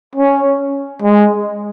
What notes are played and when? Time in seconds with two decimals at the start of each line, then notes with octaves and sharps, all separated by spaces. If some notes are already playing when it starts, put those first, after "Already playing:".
0.15 C#4
1.02 G#3